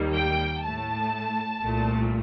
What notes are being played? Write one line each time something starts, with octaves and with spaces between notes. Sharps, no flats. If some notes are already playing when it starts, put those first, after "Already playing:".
Already playing: D#2 D#3 G3 A#3
G5
A2 A3 A5
C2 A#2 A3